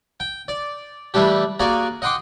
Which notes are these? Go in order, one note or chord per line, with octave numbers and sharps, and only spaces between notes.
G5
D5
E3 G3 A3 D4 G4
A#3 F#4 G#4 D5 G#5
D#5 F#5 G5 C6 D6